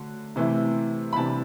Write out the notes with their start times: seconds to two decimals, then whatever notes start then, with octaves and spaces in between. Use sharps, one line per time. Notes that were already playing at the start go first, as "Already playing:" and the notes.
Already playing: D3 F#3 A3
0.36 C3 E3 A3 E4
1.13 B5
1.16 C3 E3 G3 D4 A5